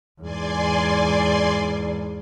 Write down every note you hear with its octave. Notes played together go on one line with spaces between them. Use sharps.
E2 G#2 D5 G#5 C6